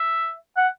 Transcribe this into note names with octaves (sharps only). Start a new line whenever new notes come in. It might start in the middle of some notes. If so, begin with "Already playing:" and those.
Already playing: E5
F#5